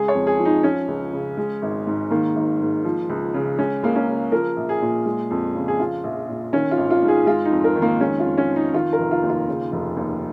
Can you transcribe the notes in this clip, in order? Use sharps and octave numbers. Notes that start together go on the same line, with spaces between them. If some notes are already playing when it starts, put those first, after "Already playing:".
Already playing: C#3 G#3 G#4
C#5
F2
G#4
F3
D#4
F3 C#4
C#2
C#3
G#3
G#1
G#2
D#3 A#3
G#1
G#2
F3
C#2
C#3
G#3 C#4
C#2 A#3
C#4
C#3
F3 A#4
A#1
G#4
A#2
G#3
F2
C#3
G#4
F3 F4
A#1
A#2
D#3 C#4
F4
G#1
F4
G#2
G#4
G#3 F4
D#4
F2
A#4
D#3
A#3
G#3 C#4
F4
F2
C#4
F3
D#4
D#3 F4
A#4
F1
F4
D#2
F4
C#3
F1
D#2